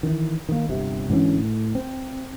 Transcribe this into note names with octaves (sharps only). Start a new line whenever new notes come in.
D#3 E3
D#3 A#3
G1 C3
G#2 D3 E3 C#4
A2
C4